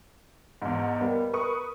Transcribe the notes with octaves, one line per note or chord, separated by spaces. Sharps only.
E2 G#2
G3 A#3 B3
A#4 B4 C#6 D#6